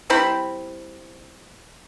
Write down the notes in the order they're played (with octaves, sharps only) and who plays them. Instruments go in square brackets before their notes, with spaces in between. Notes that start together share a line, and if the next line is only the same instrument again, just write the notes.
[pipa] G3 C4 E4 B5